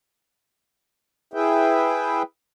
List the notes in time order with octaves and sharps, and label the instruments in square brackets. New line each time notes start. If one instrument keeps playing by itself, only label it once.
[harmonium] E4 G#4 B4 E5 G5